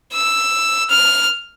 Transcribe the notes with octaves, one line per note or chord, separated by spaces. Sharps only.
E6
F6